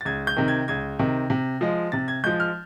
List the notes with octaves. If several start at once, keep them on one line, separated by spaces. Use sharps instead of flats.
A6
C#2 G#6
G6
C3 D#3
G#6
C#2 G#6
C3 D#3
C3
F3 G#3
C3 A6
G#6
F3 G#3 G6
F6